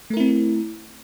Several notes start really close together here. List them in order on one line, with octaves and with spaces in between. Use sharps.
A3 A#4 E4 C4